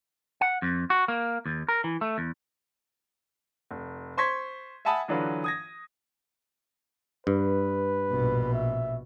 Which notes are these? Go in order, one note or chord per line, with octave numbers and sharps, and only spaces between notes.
F#5
F2
F#4
A#3
D#2
A#4
E3
A3
E2
F1
C5 C6 C#6 G#6 B6
E5 F#5 G#5 A5 B5 D#6
D3 E3 F#3 D4 F4 B4
D#6 G#6 A#6
G2 B4
A#1 B2
E5